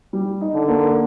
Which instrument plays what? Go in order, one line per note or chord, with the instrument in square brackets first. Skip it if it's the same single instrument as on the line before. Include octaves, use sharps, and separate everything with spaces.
[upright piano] G3
D#4
[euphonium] D3
[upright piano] A#3